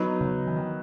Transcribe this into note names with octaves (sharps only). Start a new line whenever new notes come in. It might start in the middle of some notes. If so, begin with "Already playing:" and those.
Already playing: F#3 B3 D#4
C#3
E3
D#3